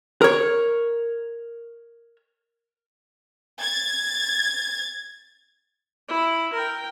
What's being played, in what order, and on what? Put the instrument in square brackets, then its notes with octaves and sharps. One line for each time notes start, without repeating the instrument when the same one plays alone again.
[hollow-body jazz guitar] A#4 C#5
[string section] G#6 A6
[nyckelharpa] E4
A#4 G5